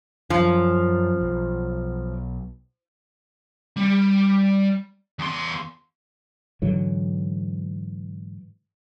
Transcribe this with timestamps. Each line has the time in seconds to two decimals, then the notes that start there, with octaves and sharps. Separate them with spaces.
0.30 F#2 F3
1.21 B1
3.76 G3
5.19 E2 C6
6.62 G#2 D3 E3 F#3